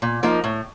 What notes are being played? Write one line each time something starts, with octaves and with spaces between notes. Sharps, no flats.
A#2
F3 A#3 D#4
A2